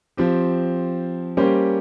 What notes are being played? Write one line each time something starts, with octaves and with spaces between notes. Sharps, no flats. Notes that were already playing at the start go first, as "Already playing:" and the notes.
F3 C4 G4
G3 A#3 C#4 G4 C5